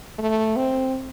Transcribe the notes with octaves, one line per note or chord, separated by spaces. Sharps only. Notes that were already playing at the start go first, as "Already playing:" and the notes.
A3
C4